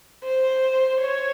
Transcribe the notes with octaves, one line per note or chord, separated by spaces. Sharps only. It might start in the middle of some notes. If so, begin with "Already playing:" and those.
C5
C#5